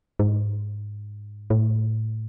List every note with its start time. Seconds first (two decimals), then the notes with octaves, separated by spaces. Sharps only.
0.19 G#2
1.50 A2